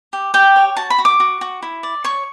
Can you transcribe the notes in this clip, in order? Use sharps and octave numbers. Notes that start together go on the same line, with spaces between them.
G4
G4 G5
C#5
F#4 A5
B5
F#4
D6
F#4
F#4
E4
D5
C#5 C#6